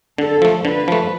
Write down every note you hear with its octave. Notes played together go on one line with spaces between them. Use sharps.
D3 A4
F3 A3
D3 B4
F3 A3